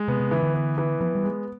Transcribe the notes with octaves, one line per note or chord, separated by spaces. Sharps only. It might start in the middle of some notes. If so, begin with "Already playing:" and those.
Already playing: G#3
C3 B3
C3
C#3 E3
D3
B3
E3
F3 B3
G3
G#3